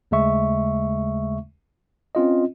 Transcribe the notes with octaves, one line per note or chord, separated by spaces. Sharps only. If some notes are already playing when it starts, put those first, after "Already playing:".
D#2 C#3 G#3 A3 E5 C#6
C4 C#4 F4 D#5